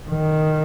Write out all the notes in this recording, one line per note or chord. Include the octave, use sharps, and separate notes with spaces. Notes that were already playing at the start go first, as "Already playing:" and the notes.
D#3